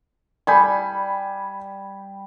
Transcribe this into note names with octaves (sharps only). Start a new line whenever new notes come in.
G3 G#5 A5 B5 G6